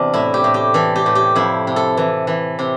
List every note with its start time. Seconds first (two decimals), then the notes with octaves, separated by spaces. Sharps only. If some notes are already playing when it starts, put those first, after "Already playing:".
Already playing: E2 C3 D4
0.14 A2 E4
0.34 G4
0.44 A2
0.54 G4
0.74 E3 A4
0.96 G4
1.06 A2
1.15 G4
1.36 F2 E4
1.67 C3
1.76 A4
1.97 E3
2.27 E3
2.59 C3